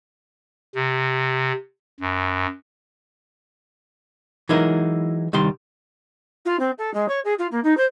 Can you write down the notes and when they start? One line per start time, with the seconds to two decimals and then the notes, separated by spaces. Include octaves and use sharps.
0.75 C3
2.00 F#2
4.49 E3 F#3 G#3 D#4 E4 A#4
5.33 C2 D#3 G3 C6
6.45 F4
6.59 C4
6.78 A4
6.94 G#3
7.08 C#5
7.24 G#4
7.39 F4
7.51 A#3
7.64 D#4
7.77 C5